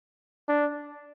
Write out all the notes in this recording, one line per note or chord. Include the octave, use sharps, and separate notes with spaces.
D4